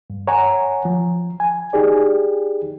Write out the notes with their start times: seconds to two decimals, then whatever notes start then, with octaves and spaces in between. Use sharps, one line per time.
0.10 G2
0.27 C#5 F#5 G#5 A#5
0.85 F3
1.40 G#5
1.73 D#4 G4 G#4 D5